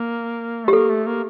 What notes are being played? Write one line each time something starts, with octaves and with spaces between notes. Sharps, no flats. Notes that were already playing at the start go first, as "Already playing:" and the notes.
Already playing: A#3
A3 G4
A#3 A4
A3
A#3